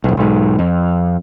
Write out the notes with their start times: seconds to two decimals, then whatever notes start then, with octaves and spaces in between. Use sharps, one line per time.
0.04 D1 B1
0.17 B1 G#2
0.59 F2